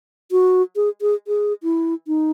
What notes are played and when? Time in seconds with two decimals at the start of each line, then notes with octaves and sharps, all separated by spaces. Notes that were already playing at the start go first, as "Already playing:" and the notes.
0.31 F#4
0.76 G#4
1.01 G#4
1.28 G#4
1.63 E4
2.07 D#4